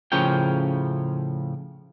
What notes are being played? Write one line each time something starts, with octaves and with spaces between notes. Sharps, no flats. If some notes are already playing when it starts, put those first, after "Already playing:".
A2 C#3 F3 C#4 A#4 G5